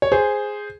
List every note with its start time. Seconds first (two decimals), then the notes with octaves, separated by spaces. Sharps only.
0.02 C#5
0.12 G#4 C5